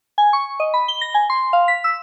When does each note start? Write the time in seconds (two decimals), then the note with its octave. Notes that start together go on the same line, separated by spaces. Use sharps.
0.18 G#5
0.33 C#6
0.60 D#5
0.74 B5
0.88 G7
1.01 A#6
1.14 G#5
1.30 C6
1.53 F5
1.68 B6
1.84 E6